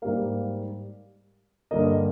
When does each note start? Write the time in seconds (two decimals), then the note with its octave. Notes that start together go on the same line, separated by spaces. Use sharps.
0.02 G#2 G3 A#3 F5
1.71 G2 D3 G3 A#3 D#5